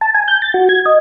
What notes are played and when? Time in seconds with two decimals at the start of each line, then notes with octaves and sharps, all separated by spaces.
0.01 A5
0.15 G#5
0.28 G6
0.42 A6
0.54 F#4
0.69 G#6
0.86 D#5